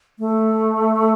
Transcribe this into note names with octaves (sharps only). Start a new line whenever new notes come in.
A3